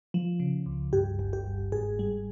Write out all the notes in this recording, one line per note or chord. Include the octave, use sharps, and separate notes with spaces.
F3
C#3
C#2
G2 G4
G1
G4
G1
G#2 G#4
G3